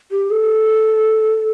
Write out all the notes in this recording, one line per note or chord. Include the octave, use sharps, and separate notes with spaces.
G4
A4